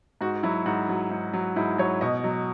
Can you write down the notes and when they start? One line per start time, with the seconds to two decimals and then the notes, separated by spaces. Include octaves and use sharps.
0.21 G#2 F#4
0.43 F#3 E4
0.66 G#2 F#4
0.89 F#3
1.11 G#2
1.33 F#3
1.56 G#2 E4
1.78 F#3 C#5
2.01 B2 D#5
2.24 F#3